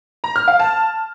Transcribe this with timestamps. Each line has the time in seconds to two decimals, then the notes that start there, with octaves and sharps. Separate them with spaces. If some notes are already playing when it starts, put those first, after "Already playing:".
0.24 A#5
0.36 F6
0.48 F5
0.60 A5